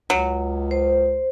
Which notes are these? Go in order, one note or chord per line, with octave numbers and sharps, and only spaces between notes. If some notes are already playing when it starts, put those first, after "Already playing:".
C#2 F#3
C5